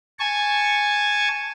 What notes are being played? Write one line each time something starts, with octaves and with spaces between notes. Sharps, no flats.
G#5 A5 C#6